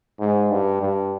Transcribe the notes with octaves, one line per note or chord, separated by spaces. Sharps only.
G#2
G2
G2